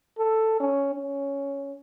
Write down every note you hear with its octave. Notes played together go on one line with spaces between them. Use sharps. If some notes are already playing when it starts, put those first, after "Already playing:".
A4
C#4
C#4